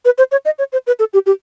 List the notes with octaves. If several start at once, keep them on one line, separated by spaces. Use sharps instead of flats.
B4
C5
C#5
D#5
C#5
C5
B4
A4
G4
G4